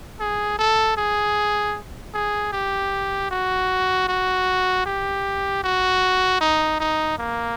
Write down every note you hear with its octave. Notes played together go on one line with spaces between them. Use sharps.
G#4
A4
G#4
G#4
G4
F#4
F#4
G4
F#4
D#4
D#4
A#3